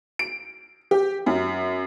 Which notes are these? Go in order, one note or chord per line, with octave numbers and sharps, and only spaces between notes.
D7
G4
F#2